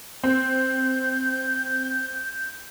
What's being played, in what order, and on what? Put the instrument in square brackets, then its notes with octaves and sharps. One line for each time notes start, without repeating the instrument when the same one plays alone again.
[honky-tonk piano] C4 [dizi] G6